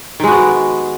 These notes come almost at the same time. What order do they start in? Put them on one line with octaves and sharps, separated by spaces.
D#3 G#3 F#4 B3